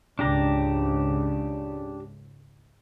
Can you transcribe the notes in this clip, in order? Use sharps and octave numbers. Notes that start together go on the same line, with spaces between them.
C#2 G#2 C#3 D4 G4 A#5